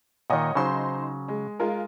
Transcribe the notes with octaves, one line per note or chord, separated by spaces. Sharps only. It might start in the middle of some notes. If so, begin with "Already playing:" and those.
A#2 D#3 C#5 D#5 F#5
C#3 F#3 D#4 C5 C6
G#3
G#3 F4 A#4